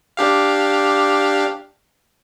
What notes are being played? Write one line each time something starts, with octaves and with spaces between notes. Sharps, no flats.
D4 G4 F5